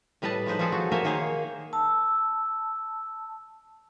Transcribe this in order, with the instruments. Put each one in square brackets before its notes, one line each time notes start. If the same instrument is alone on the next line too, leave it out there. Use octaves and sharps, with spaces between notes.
[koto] A2 G3 B4 D#5 A5
F3 G#3 D#4 B4 C5
F3 G3 C4 G#4 A4
F#3 F#4
A#3 C5 C#5 E5 G#5
D#3 A#3 G#4 C5 C#5
[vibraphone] A5 E6